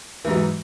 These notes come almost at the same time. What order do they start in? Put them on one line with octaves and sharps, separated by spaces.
E3 G#2 F#3